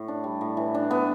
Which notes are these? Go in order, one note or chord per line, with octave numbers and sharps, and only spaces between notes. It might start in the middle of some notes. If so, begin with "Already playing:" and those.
Already playing: A2
D4
G3
A2
E3
D4
B3